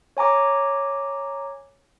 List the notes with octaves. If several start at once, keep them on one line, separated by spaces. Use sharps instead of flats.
C#5 G#5 A#5 D6